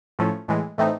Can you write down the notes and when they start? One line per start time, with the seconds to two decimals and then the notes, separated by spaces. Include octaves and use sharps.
0.19 A2 F3 A3 C#4
0.48 A2 E3 G#3
0.78 A2 E3 A3 C4 D#4